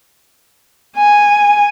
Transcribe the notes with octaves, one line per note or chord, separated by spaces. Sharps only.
G#5